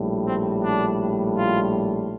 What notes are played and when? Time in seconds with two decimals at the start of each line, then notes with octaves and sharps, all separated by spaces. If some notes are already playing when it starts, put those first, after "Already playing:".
Already playing: A#1 A2 G3
0.26 C4
0.63 D4
1.37 F4